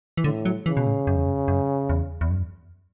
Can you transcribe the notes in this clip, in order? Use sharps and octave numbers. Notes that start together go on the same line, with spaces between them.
E3
A2 D3
F#3
C#3 E3
B2
A2
F#2
E2
F#2
F#2
E2
E2
F#2